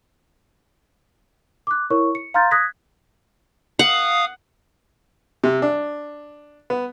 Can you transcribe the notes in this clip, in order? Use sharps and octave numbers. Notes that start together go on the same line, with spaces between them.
D6 F#6
E4 A#4 C#5 C#6
C#7
F5 A#5 C6 F6 G6 A6
D#6 F#6 G#6 A#6 B6
F5 F#5 D#6
C3
D4
B3